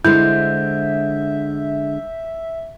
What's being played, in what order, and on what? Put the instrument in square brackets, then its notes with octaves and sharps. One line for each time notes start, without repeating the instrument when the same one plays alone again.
[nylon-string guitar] D3 G#3 C5 [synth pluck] E4 [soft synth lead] E5 [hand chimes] G6